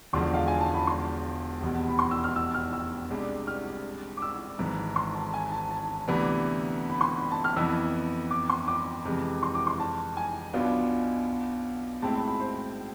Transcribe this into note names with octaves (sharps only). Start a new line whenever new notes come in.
E1 E2 D3 F3 G#3 C6
F5
G#5
A5
B5
C6
F1 E2 B2
B5
C6
E6
F6
E6
F6
E6
C2 C3 G#3 D4
F6
D6
E6
G#1 G#2 E3
C6
A5
G#5
A5
A5
D2 C3 E3 B3 D4 B5
B5
C6
B5
A5
F6
F2 E3 B3 E4 E6
D6
C6
D6
F2 C3 E3 G#3
C6
D6
C6
A5
G#5
B1 B2 B3 D4 F4
A2 G#3 C4 E4 A5
B5
B5
C5